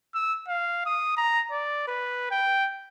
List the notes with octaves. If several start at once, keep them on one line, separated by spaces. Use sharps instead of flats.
E6
F5
D#6
A#5
D5
B4
G5